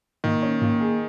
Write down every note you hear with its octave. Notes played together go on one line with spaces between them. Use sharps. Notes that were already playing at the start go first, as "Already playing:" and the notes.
A#2 D#3
C#4
A#2
G#4